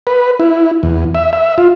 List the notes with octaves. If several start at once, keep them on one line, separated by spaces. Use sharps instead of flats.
B4
E4
E2
E5
E5
F4